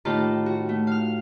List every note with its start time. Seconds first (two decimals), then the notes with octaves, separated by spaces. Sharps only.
0.05 A2 D#3 F4 G4 A5
0.46 F#4
0.69 A3
0.87 F5 F6